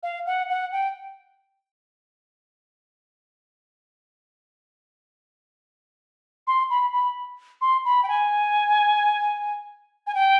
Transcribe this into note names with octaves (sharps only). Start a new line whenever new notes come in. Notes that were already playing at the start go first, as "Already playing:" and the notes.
F5
F#5
F#5
G5
C6
B5
B5
C6
B5
G5
G#5
G#5
G5